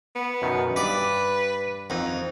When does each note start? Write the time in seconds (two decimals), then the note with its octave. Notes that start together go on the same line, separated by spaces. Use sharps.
0.15 B3
0.42 F#2 B2 D#3
0.76 G2 B4 D5
1.90 F2 D#4